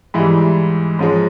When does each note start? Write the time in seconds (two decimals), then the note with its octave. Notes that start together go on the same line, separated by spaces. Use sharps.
0.14 G#2 E3 G3 E4
0.99 G#2 F3 G#3 C#4